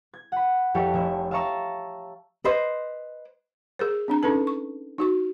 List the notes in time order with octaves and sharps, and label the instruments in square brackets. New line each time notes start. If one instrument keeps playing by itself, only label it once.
[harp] G#6
F#5 B5
F2 G4 A4 C#5 E5
F1 E5
E5 F5 A5 A#5 C#6 E6
[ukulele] B4 C5 D#5
[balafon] G#4 A#4 C5
C4 D4 A#5
C#4 D#4 A4 B4 A5
C#6
D#4 F#4 C#6